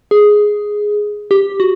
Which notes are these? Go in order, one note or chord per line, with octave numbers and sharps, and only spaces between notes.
G#4
G4
F#4